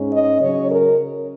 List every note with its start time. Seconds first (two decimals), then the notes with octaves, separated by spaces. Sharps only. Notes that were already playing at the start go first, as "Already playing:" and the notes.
Already playing: G#2 G#3 C#4
0.12 D#5
0.41 C#3 F#3 C#4 C#5
0.69 A#4